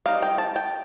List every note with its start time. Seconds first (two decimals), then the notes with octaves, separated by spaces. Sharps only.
0.06 G3 C4 D#4 F5
0.22 G5
0.38 A5
0.56 G5